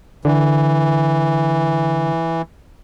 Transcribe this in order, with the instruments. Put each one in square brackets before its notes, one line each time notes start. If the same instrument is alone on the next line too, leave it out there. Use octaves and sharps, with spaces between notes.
[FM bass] D3 [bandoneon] E3